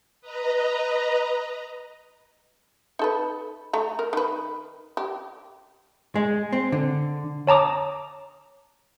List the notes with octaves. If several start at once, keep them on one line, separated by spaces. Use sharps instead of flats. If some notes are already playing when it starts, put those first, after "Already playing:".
B4 D#5 A#5
D#4 A4 B4
A3 A#5
A#4
D#3 B4
G4
G#3
C4
D3
C#5 A5 A#5 D6 D#6